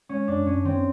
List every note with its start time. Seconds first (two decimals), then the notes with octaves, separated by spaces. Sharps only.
0.09 G#3 C#4
0.28 F#2 D4
0.47 F#2 C#4
0.65 D#3 C4